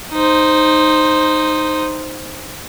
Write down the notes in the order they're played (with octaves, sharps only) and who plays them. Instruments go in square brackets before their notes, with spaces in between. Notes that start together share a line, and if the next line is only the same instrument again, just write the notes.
[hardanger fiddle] D#4 C5